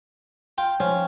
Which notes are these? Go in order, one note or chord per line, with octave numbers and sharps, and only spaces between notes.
F4 G5
F3 C#4